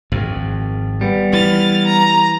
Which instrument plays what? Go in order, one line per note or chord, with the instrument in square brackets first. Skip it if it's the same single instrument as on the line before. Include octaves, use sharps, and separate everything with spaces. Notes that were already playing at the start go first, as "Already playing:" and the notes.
[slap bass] G#1 F2
[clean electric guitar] G3 B3
[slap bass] E3 [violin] F6 A6
[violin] A#5